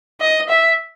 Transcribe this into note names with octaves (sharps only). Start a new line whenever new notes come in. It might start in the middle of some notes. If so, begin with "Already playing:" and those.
D#5
E5